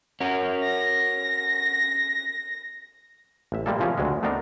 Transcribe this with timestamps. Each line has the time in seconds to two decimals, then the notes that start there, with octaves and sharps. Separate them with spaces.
0.21 C#4 F#4 A#4
0.63 A#6
3.52 A1 E5
3.66 G3 G#3 A#3 A4
3.79 C#3 E3 F3 C4 C#4
3.98 D2 F#3 G#3
4.23 A3 B3 C4 D4 D#4 A#4